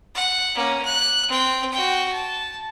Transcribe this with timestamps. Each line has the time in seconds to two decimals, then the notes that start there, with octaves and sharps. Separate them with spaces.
0.15 F#5
0.55 A#3 C#4
0.85 F#6
1.28 C4 G5
1.72 F#4 G5
2.13 A5